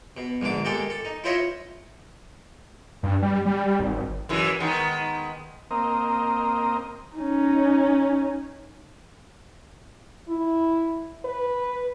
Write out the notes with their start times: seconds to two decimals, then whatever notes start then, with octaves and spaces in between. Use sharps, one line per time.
0.17 B2
0.41 A#1 G#2 D3 D6
0.65 G#3 A#3 G4 A4 G5
0.90 A4
1.05 D#4
1.24 E4 F4 C5 C#5 D#5 E5
3.03 G2
3.22 G3
3.46 G3
3.80 G#1
4.29 F#2 E3 G#3
4.60 D#3 G#3 B3
5.71 A#3 C4 D#5
7.16 C#4 D#4
10.29 E4
11.25 B4